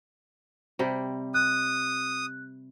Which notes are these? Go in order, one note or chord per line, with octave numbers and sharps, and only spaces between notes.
C3 G3 G4
D#6 F#6